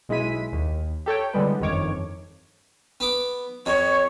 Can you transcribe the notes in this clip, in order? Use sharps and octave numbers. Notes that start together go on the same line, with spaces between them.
B1 G#3 E4 B6 D#7
D#2
G4 A4 C#5 G5
D3 E3 G3 G#3 B3
G1 F2 D#3 C#5 D6
B3 D6
F2 C#5